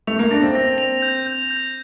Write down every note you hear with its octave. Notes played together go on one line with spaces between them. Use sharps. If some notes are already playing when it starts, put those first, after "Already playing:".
A3 F7
A#3
D4 A#6
C4
A#6
F7
G6
G6
G6